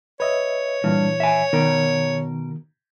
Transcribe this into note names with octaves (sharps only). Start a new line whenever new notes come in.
B4 C#5 D#5 E5
G2 A#2 E3
E5 G#5
B2 D#3 A#4